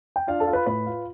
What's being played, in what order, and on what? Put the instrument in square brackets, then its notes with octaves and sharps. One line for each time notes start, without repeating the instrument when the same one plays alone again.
[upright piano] G5
D4 F4 F5
A4 A5
F4
B4 B5
A2 B4 B5
F4